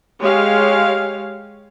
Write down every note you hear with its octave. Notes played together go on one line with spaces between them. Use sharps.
G#3 G4 C#5 F5